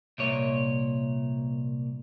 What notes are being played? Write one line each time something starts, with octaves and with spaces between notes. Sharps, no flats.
C2 A#2 C#5